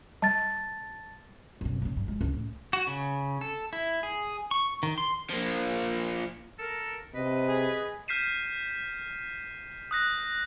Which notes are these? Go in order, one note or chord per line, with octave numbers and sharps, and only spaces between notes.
G3 A5 A6
F#2 B2
A#2 C#3
G2
G#3
C#2 G2
A2
F#4
C#3
A4
E4
G#4
C#6
D#3
C6
F3 A#3
A4 A#4
C3 B4 D#5
G#4
F6 G6 B6 C7 D#7 E7
D#6 F#6 A#6